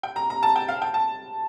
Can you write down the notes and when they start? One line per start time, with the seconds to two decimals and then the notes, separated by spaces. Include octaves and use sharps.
0.03 G5
0.16 A#5
0.30 A#5
0.43 A5
0.56 G5
0.68 F5
0.82 G5
0.94 A5